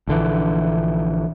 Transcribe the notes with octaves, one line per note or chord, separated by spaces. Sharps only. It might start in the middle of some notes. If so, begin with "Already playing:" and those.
A#1 D3 E3